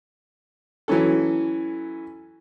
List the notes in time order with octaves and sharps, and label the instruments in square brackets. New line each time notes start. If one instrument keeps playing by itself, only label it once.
[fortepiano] E3 F#3 C#4 A4